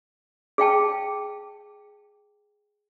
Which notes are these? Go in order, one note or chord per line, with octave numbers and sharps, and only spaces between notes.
G#4 F5 G5 A5